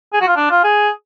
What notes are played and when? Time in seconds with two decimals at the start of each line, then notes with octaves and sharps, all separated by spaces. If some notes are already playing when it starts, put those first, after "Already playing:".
0.13 G#4
0.21 F#4
0.28 F4
0.36 D4
0.51 F4
0.64 G#4